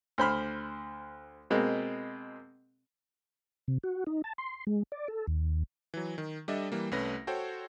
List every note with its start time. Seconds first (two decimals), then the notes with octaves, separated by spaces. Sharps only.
0.18 D2 C5 B5 F6
1.50 B2 G#3 A#3 C4
3.68 C3
3.84 F#4
4.07 D#4
4.24 A5
4.38 C6
4.67 G#3
4.92 D5
5.08 A4
5.27 D#2
5.94 E3 F#3
6.18 D#3
6.48 G3 D4 A4 D#5 E5
6.72 E3 G3 A#3
6.91 C2 A3 C#4 B4 A#6
7.27 F#4 A4 C5 C#5 G5